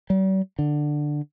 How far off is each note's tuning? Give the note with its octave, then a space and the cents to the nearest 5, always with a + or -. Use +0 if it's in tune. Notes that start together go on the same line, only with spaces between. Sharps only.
G3 -45
D3 +10